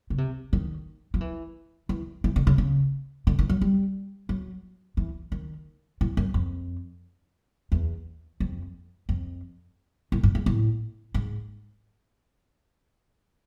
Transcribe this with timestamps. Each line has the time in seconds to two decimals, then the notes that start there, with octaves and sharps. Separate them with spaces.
0.10 C#3
0.18 C3
0.53 D#3
1.14 F3
1.21 E3
1.89 E3
2.24 E3
2.36 D3
2.47 C#3
2.58 C#3
3.27 D3
3.39 D#3
3.49 F#3
3.61 G3
4.29 F#3
4.97 E3
5.32 D#3
6.01 A2
6.17 F#2
6.34 F2
7.72 E2
8.40 F2
9.09 F2
10.12 A2
10.23 G#2
10.35 G#2
10.46 A2
11.14 G#2